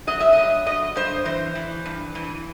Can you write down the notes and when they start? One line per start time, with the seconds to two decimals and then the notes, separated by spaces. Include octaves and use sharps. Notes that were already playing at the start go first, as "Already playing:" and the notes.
0.07 F#3 D#5
0.20 E5
0.33 G2 D#5
0.66 G2 D#5
0.96 G2 C5
1.25 E3 C5
1.55 E3
1.85 G2
2.15 E3